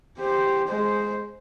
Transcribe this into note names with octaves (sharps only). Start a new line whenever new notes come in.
G4 C5
G#3 C5